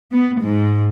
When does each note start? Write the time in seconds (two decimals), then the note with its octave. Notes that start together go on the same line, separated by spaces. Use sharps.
0.12 B3
0.41 G#2